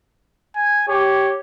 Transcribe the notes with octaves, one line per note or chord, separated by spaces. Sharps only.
G#5
G4 C#5